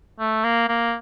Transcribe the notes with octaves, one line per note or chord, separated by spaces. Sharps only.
A3
A#3
A#3